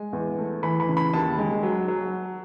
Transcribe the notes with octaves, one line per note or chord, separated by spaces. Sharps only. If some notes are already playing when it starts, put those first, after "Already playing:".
Already playing: G#3 G#5
E2
A3
E3 B5
B5
C#3
B5
D#2 A5
G#3
F#3
F#3